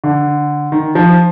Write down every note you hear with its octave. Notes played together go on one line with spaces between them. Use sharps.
D3
D#3
F3